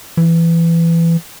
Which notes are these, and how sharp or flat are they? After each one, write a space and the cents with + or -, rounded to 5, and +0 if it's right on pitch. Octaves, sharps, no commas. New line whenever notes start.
E3 +20